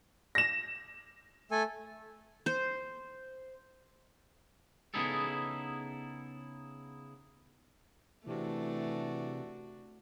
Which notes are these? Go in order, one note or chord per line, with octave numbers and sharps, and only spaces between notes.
A#6 E7
A3 A4 G#5
C5
C#3 B3 D#4 E4 G#4 A4
C3 E3 A3 D4 F#4